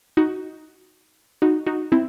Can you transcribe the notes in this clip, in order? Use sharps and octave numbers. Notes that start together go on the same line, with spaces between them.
D#4 F#4
D#4 F#4
D#4 F#4
C4 E4